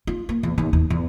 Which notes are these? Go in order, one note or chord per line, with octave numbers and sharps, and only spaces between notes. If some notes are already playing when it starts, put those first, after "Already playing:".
F4
A#3
E2
D#2
D#2
E2